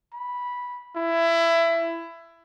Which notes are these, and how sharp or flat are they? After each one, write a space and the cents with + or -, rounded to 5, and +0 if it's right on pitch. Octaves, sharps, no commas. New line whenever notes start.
B5 -10
E4 +20